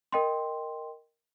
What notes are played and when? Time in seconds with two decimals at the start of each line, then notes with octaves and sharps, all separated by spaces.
0.12 A#4 D#5 G5 C6